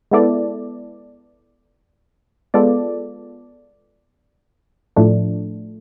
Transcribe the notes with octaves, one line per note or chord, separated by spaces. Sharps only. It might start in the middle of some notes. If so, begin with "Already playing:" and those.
G#3 B3 E4 A4 D5
G#3 B3 F4 A4 D5
A2 F3 A3 D4